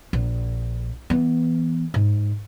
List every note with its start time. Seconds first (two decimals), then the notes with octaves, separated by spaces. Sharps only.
0.13 A#1
1.10 E3 B3
1.94 G#2